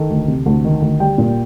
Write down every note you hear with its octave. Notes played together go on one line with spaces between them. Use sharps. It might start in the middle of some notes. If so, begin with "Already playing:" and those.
Already playing: D#3 A4
D2
C3
D2
D#3
D2
G3 G5
A#2